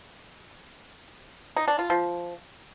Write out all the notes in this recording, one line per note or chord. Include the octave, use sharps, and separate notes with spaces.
D#4
D4
F4
F3